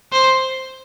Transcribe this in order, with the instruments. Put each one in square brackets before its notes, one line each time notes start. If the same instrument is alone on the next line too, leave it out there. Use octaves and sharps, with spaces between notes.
[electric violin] C5